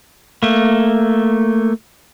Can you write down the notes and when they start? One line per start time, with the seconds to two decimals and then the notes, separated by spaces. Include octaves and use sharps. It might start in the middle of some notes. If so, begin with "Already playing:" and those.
0.43 A3 A#3